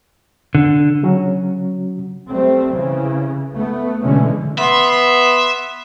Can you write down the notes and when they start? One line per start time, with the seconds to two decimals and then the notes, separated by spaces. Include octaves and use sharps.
0.55 D3
1.03 C#3 F#3 C#4 F#4
2.30 G3 A3 C4
2.73 C#3 E3
3.53 A3 B3
4.03 B2 D3 E3 G#3 A3 C#4
4.58 B3 E5 C6